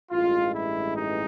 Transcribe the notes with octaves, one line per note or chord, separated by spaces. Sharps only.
A1 G2 E3 G#3 F4
E4
D#4